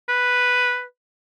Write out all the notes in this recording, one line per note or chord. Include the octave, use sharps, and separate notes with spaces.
B4